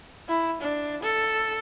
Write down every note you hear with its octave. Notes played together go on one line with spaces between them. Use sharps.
E4
D4
A4